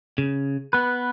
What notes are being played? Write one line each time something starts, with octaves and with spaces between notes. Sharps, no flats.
C#3
B3 B4